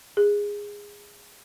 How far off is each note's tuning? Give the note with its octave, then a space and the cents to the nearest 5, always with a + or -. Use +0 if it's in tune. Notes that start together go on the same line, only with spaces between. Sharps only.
G#4 -15